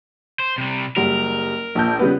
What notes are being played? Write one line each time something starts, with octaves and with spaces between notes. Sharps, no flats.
C5
C3 G3
F#1 G3 A#4
A#1 A5 G6
C#3 G3 B3